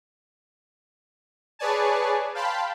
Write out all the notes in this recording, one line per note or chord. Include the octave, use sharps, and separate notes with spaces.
G#4 B4 C#5 D5 G#5 A5
F5 G5 A5 B5 C6